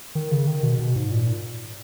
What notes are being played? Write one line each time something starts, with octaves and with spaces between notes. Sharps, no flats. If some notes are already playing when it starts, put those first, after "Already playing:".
D#3
C#3
D#3
B2
B2
G#2
A#2